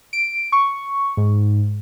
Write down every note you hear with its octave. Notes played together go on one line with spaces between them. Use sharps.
D7
C#6
G#2